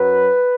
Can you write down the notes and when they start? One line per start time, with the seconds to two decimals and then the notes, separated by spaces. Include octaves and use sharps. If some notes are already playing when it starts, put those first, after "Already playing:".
Already playing: F#2 F#3 B4